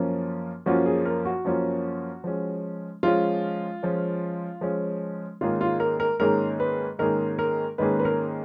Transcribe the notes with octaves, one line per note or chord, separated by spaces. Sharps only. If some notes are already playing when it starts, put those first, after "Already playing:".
Already playing: F#2 F3 A#3 C#4 F4
F#2 F3 A#3 C#4 F4 F#4
G#4
A#4
F#4
F#2 F3 A#3 C#4 F4
F3 G#3 C#4
F3 G#3 C#4 F4
F3 G#3 C#4
F3 G#3 C#4
G#2 D#3 A#3 C#4 F4 G#4
F4
A#4
A#4
G#2 D#3 A#3 C#4 G#4 A#4
B4
G#2 D#3 A#3 C#4 G#4 A#4
A#4
G#2 D#3 A#3 C#4 G#4 B4
B4
A#4